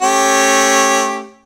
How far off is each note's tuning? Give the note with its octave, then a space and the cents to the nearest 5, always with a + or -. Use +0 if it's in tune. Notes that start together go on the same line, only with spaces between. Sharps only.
A3 +0 C#4 -20 G4 +0